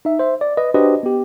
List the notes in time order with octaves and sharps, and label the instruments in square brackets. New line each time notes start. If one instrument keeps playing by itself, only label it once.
[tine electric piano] D#4 E5
C5 E5
D5
B4 D#5
D4 F#4 G4 B4 C5 D#5
B3 G4